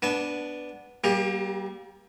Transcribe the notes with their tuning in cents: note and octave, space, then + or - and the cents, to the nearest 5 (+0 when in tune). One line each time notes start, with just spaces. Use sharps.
B3 +0 D4 +0 A5 -45
G3 -30 A#3 +30 G4 +30